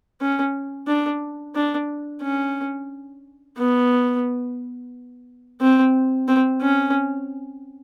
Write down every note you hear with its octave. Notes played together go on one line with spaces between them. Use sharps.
C#4
D4
D4
C#4
B3
C4
C4
C#4